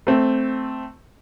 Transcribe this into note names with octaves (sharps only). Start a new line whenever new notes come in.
A3 C4